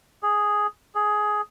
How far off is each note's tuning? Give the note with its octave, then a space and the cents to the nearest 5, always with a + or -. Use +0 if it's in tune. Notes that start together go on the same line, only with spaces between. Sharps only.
G#4 +0
G#4 +10